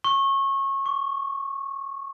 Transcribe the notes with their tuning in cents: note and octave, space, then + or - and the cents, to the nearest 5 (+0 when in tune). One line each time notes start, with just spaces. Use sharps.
C#6 -25
C#6 +35